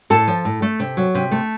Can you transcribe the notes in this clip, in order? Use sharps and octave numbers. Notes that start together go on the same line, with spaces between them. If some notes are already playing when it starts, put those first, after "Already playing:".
A2 A4 A5
F3
A2
A3
C3
F#3
C3
A3